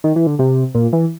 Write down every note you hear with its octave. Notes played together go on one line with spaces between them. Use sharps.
D#3
E3
D3
C3
A#2
E3